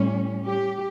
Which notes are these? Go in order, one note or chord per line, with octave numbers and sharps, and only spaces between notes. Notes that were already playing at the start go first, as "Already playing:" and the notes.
Already playing: A2 G3 C#4
G4